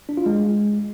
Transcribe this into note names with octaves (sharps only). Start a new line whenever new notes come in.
D4
F4
G#3